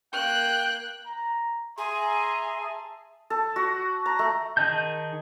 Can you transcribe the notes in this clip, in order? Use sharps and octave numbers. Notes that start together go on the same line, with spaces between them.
A#3 G5 F#6
A#5
G#4 E5 A#5 C6
E5 A5
A4
F#4
A#5
A3
D#3 G#4 D#5 A5 G6